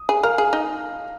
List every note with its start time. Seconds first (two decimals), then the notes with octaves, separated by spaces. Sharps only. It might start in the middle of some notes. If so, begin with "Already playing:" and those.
Already playing: D#6
0.09 G#4
0.23 A#4 F5 F6
0.38 G#4
0.53 D#4